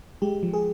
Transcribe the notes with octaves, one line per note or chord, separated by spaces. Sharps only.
G#3 G4
F3
G#4